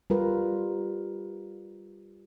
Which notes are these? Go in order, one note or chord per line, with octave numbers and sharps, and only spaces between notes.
G3 F4 A#4 B4